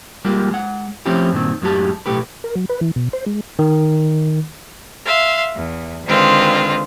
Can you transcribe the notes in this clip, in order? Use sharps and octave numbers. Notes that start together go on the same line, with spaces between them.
G3 G#3 A#3 F4 G4
G#3 F#5
F3 A3 C4 C#4 E4 G4
G2 A#2 D#3 C4
F#2 A2 F#3 G#3 G4 A5
B1 F2 A2 A3 G4 B4
A#4
F#3
B4
E3
B2
C5
G#3
D#3
E5 F5 C6
E2
D3 D#3 G#3 C4 F4 B4